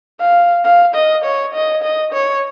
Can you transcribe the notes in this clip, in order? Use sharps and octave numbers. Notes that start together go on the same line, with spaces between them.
F5
F5
D#5
C#5
D#5
D#5
C#5